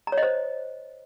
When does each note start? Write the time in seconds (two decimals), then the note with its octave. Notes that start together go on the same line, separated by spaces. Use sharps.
0.07 A#5
0.12 C#5
0.18 D#5
0.23 C5